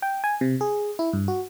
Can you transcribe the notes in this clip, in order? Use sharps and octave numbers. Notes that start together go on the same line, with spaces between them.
G5
G#5
C3
G#4
E4
G2
F#4